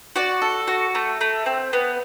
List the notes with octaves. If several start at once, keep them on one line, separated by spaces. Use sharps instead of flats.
F#4 D5
A4
F#4
A3
A3
C4
B3